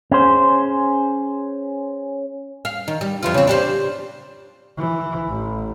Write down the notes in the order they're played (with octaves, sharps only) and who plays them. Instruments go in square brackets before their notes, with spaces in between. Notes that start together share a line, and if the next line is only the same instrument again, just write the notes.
[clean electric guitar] C#4 G#4 C5
[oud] F5
D#3
G3
F2 E3 F4
C#3 C4
D4 G4 C5
[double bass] E3
A1